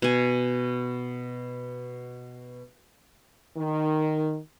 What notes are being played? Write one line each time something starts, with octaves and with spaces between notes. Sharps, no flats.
B2 G#5
D#3